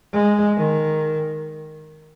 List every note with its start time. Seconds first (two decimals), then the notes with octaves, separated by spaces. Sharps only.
0.13 G#3
0.57 D#3